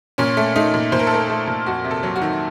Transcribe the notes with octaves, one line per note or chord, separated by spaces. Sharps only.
A#2 C#4
A3
A3 D#4
A#2
A#2 C5
A#4
A4
A3 A#4
A3
A#2
F2 F#4
C3
A4
F#3
F#4
D#3